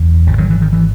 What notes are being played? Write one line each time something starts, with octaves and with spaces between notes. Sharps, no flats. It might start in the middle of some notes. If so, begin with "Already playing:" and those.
Already playing: F#1 E2
G#1 F#2 C#3
D#3 F#3
E3
D#3
E3